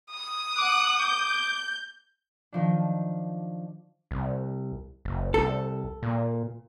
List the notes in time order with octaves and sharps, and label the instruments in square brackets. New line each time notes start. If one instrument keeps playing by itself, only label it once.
[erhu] D#6
[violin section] F#5 F#6 [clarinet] D6
[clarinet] D6 [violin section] G6
[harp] D#3 F3 D4
[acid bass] C2
F#1
[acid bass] C2 [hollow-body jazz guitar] A4
[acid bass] A#2